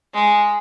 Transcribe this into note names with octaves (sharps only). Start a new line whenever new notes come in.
G#3